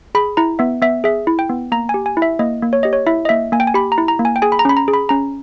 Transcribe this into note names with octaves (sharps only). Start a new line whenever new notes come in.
G#4 B5
E4 A#5
B3 E5
B3 E5
G#4 E5
E4
G5
B3
A#3 A#5
G#5
G4
G#5
E4
E5
A#3 D#5
A#3
C#5
G4 D#5
C#5
E4 E5
D#5
A#3 E5
A#3 G#5
G5
G#5
G4 B5
A#5
E4
A#5
A#3
G#5
G5
G#4 G#5
B5
A#5
C#4 B5
A#5
G#4
B5
C#4 A#5